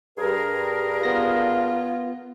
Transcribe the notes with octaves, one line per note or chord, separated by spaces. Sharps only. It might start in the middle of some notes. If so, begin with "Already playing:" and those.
G2 G#4 A#4
B3 F4 A#6